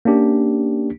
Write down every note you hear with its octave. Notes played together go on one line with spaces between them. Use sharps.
A#3 C#4 D4 G4